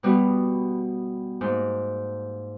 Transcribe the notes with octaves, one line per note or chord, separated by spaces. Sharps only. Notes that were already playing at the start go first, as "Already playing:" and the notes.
B2 G3 B3 F#4
G#2 A#3